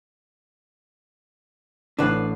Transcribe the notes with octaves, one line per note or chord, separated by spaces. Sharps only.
A1 D4 E4 B4 F#5 C7